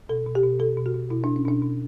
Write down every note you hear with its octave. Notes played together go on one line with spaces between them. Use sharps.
B2 A4
B2
G4
B2
B2 A4
B2
F#4
B2
B2 E4
B2 D4
C#4
B2 D4
B2